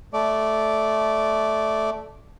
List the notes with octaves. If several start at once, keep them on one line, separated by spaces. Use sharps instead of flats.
A3 D5